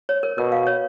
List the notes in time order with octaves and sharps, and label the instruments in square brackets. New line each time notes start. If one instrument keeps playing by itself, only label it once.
[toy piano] C#5
A#4
[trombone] B2 [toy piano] A#4
[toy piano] F5
C#5